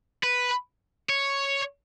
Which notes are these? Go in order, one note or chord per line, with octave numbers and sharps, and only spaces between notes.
B4
C#5